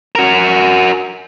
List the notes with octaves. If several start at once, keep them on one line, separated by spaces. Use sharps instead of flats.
F#4 A#4